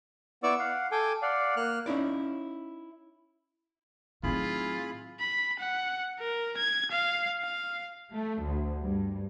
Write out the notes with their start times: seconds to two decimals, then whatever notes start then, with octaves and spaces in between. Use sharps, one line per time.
0.43 B3 E4 D5 C#6 D6 E6
0.59 F5 F#5
0.92 A4 G5 G#5 D6
1.22 D5 F5 F#5
1.57 A#3 F6 F#6
1.86 C#4 D#4 E4 D5
4.24 A2 D#3 F#3 C4 E4 F4 G#4 B5
5.20 B5
5.59 F#5
6.19 A#4
6.57 G#6
6.91 F5
7.42 F5
8.12 A3
8.41 D2
8.81 G2